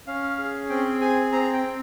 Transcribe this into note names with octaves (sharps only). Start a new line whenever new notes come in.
C#4 F5
G#4
C4 G5
G#4 G#5
C4 A#5
G5
C4